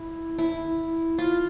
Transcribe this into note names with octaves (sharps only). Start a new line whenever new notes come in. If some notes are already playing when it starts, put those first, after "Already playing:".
Already playing: E4
E4
F4